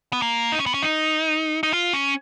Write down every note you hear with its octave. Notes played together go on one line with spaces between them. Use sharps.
B3
A#3
D#4
C#4
B3
C#4
D#4
D#4
F4
C#4